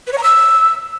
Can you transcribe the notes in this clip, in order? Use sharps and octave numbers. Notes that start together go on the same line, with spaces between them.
B4
C#5
A#5
E6